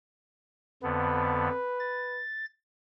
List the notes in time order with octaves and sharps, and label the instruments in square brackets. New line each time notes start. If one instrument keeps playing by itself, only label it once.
[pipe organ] F2 D3 B3 [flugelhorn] B4
[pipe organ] A6